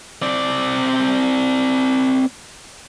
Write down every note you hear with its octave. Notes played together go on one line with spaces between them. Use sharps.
C4 D5